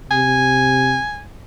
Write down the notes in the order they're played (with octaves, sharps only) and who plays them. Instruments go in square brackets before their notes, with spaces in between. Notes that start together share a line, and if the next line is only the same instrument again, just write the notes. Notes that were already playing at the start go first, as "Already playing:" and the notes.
[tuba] C3 [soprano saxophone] G#5